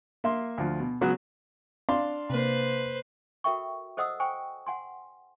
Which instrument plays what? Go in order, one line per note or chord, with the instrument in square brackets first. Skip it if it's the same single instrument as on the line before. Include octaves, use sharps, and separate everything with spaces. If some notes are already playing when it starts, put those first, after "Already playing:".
[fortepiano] A#3 E5 C6
D2 F3
B2
C#3 F#3 G#3 B3 F#4
D4 F5 C6
[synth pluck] C3 A#3 [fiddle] B4 C5
[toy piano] F#4 A4 A#4 E5 G5 C#6
A4 C5 D#5 F#5 D#6 E6
C5 G5 G#5 C#6
F#5 G#5 C6